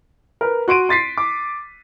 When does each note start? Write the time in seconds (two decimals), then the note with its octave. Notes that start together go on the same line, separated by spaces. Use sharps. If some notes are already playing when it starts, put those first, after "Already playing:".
0.41 A#4 B4
0.68 F#4 C6 D7 D#7
0.89 C6 A6 B6 C7
1.17 D6